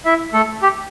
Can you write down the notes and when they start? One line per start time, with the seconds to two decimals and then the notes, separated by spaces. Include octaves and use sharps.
0.05 E4 E5
0.33 A3 A4
0.62 G4